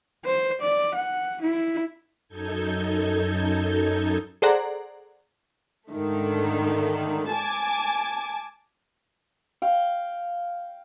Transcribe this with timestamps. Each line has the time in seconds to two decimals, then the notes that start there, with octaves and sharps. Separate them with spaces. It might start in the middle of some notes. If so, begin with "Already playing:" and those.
0.25 C5
0.61 D5
0.95 F#5
1.42 E4
2.28 F#2 D#4 A4 G6 G#6
4.42 G#4 A4 C5 D5 F#5 A#5
5.89 G#2 D3 D#3 A3
7.29 G#5 A5 D6
9.62 F5 G5